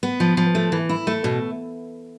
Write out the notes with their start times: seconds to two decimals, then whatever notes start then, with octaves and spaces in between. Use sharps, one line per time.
0.03 B3
0.20 F3
0.37 F3
0.55 A3
0.72 E3
0.89 E4
1.07 A3
1.24 B2